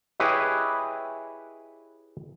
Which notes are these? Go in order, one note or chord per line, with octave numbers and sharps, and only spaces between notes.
E4 G4 G#4 B4 C#5 D#5